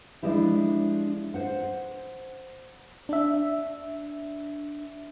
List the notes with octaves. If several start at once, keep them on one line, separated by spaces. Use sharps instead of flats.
F3 G#3 D4 E4 G4
C5 F#5
D4 E5